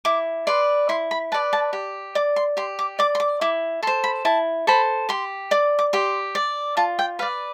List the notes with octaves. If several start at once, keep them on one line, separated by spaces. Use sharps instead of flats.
E4 D6
B4 D5 C6
E4 C6
B5
B4 D5 A5
A5
G4
D5 D6
C6
G4 C6
D6
D5 D6
C6
D6
E4 D6
A4 C5 C6
B5
E4 A5
A4 C5 B5
G4 C6
D5 D6
D6
G4 C6
D5
F4 A5
G5
B4 D5 F5